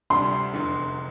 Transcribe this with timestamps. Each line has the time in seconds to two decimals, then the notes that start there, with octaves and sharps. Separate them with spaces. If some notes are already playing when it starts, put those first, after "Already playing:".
0.10 D2 C3 G3 D4 C6
0.53 F1 E2 D3